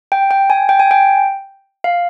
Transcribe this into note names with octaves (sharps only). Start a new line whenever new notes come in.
G5
G5
G#5
G5
G#5
G5
F5